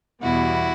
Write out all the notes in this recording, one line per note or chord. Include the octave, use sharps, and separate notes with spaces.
E2 B2 G3 E4 F#4